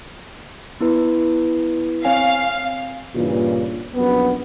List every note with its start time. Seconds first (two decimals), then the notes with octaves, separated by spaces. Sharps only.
0.81 B3 E4 B4
2.05 C4 C#5 F5 G#5
3.13 G2 A#2 C#3 E3
3.95 A#1 F#2 B3